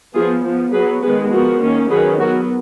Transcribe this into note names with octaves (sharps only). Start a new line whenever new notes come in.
F3 B3 F4 G#4
F3 B3
F#3 B3 G#4 B4
D#3 G#3 B3 G#4 B4
F3 B3 F#4 A#4
D#3 A#3 C#4
D#3 F#3 C#4 G#4 B4
F#3 B3 F#4 A#4